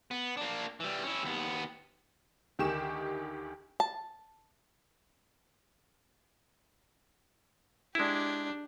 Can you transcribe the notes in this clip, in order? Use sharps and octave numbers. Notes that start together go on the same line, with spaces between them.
B3
A#3 D4
E3 G3
C#4 E4
D#2 B3
D2 D#3 G4 G#4 C#6 E7
A5
G#3 D4 E4 G4